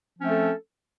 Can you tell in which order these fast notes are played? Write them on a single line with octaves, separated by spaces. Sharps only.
F3 C#4 C4 A3 A4